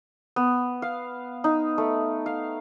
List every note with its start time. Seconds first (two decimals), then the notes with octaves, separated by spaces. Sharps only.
0.36 B3
0.82 F5
1.44 D#4
1.78 A3
2.26 F5